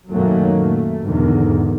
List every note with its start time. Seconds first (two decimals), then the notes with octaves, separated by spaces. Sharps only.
0.10 F#2 A#2 D#3 F#3 A3 A#3
0.57 A3
1.04 E2 G#2 B2 D3 D#3